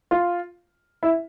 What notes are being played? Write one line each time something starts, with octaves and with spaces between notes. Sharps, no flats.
F4
E4